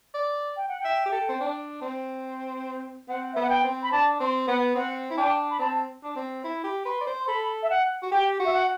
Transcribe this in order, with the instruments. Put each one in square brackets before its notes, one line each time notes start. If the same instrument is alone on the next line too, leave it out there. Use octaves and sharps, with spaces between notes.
[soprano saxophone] D5
[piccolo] G5
F#5
[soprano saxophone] E5 [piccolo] G5
[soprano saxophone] G4
A4
C4
D4
C4
[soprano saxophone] C4 [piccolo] F#5
[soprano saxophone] B3 [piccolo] E5
[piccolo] F#5
G5
[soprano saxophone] C4
[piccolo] B5
[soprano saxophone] D4 [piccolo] A5
[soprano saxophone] C4 [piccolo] C6
[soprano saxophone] B3 [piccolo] F#5
[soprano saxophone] C4 [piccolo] F#5
[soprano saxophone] E4
[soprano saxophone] D4 [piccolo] G5
[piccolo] B5
[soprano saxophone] C4 [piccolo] A5
[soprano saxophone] D4
C4
E4
G4
[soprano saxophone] B4 [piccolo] C6
[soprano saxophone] D5
C5
[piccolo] C6
[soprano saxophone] A4 [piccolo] B5
[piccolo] E5
F#5
[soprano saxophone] F#4
[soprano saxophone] G4 [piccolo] G5
[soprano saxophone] F#4
[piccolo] E5
F#5